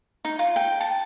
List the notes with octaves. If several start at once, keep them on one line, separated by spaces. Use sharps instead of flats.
D#4
F4
G5
A5